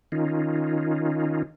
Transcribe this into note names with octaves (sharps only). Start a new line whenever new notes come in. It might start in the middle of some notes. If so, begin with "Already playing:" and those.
D#3 C#4 D#4 F4